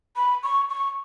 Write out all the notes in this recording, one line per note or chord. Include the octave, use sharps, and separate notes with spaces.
B5
C#6
C#6